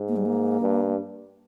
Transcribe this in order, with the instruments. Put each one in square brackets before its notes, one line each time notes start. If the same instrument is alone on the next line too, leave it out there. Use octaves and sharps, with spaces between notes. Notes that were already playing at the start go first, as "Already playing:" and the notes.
Already playing: [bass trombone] G#2
[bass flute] A#3
G3
A#3
[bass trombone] G2